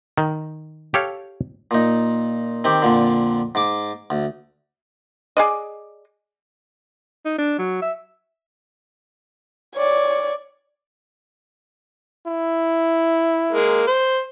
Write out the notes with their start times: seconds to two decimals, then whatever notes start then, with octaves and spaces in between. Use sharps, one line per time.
0.18 D#3
0.94 G4 A4 C#5 F5
1.71 A#2 D#4
2.64 D#3 C4 G4
2.82 F2 A#2 D3
3.55 G#2 D6
4.10 D2
5.37 G#4 D5 D#5
7.25 D#4
7.38 D4
7.59 F#3
7.82 E5
9.75 C#5 D5
12.27 E4
13.52 G#3 A#3
13.87 C5